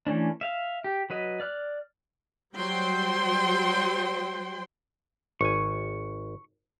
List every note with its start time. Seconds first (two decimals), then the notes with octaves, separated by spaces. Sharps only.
0.07 E3 A3 C#4 D4
0.41 E5 F5
0.84 G4
1.10 F#3 B4 D#5
1.40 D5 F6 F#6
2.56 F#3 G3 C5 G5 C6
5.41 G#1 G#5 C#6